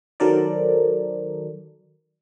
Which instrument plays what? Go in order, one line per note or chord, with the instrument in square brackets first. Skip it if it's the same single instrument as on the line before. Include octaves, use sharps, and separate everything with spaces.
[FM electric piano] D#3 F#3 A4 A#4 C5 D5